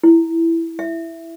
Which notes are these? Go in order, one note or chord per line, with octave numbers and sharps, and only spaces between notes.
E4
E5